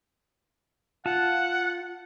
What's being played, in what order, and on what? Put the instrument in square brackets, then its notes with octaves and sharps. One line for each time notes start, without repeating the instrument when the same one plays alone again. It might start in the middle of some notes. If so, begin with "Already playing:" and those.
[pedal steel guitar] F4 A5 [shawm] F#5